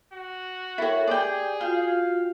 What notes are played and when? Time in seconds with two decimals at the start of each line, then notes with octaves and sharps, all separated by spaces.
0.13 F#4
0.78 E4 A4 A#4 C#5 G5
1.07 G4 G#4 D5 G5
1.61 F4 F#4 F5 G5